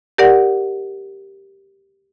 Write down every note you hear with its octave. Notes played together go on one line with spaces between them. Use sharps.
G4 A#4 D5 F#5